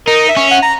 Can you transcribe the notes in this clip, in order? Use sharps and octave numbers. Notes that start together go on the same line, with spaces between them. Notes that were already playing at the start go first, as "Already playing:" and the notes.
D#4 A#4
E5
C#4
F#5
A#5